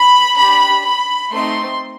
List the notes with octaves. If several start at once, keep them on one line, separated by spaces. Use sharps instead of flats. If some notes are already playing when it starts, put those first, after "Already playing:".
Already playing: B5
D4 G4 B5
B5
A3 C4 D#4 C6